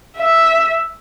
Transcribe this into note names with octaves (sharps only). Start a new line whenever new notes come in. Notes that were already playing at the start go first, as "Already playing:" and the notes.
E5